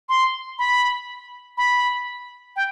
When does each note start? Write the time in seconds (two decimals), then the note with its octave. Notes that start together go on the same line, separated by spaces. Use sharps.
0.09 C6
0.59 B5
1.58 B5
2.56 G5